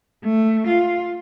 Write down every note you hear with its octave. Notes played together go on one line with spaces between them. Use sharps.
A3
F4